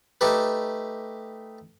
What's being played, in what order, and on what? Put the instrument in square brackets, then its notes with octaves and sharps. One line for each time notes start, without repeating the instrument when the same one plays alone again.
[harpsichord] A3 D#4 G4 B4